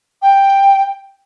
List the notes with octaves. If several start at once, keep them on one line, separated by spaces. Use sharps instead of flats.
G5